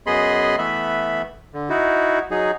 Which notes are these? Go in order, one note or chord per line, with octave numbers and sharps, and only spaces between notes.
F#2 B3 G#4 D#5 B5 C6
E3 A3 B3 E5 B5
D3
D#4 E4 F#4
F#3 D#4 G#4